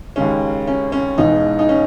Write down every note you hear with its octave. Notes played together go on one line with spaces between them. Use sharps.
D#2 C#3 G#3 C#4
C#4
C#4
E1 E2 B2 G#3 D#4
D#4
C#4